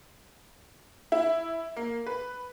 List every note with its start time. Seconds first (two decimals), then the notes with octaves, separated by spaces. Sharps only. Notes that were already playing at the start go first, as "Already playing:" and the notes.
1.12 E4
1.76 A#3
2.07 B4